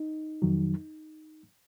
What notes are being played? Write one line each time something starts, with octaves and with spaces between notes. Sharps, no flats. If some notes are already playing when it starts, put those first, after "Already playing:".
Already playing: D#4
F2 D#3 F#3